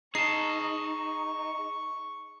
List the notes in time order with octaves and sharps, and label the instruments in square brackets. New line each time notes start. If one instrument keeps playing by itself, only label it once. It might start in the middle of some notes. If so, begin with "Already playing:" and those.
[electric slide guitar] D#4 [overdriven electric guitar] G#4 A5 [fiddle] C#6 [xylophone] C7